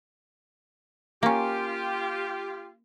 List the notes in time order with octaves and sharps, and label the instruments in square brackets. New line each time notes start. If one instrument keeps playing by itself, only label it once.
[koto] A#3 C#4 [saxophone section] F4 G4